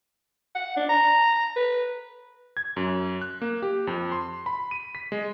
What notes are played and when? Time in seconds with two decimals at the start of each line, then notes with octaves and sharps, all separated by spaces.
0.55 F#5
0.77 D4
0.89 A#5
1.56 B4
2.57 G#6
2.77 F#2
3.21 F#6
3.42 A#3
3.62 G4
3.87 F2
4.12 C6
4.46 B5
4.71 D#7
4.95 B6
5.12 G#3